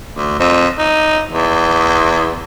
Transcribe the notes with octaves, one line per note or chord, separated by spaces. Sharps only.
D2
F2
D#4
E2